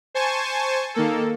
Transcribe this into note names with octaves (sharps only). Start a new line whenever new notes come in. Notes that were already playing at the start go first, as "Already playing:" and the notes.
C5 G#5 A5 C#6
D#3 A#3 A4